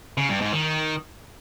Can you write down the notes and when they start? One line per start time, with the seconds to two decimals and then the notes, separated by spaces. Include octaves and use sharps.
0.17 C#3
0.29 G2
0.41 G#2
0.53 D#3